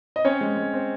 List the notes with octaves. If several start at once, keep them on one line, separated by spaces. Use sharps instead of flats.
D#5
C4 C#4 C#5
G#3
G#3
C4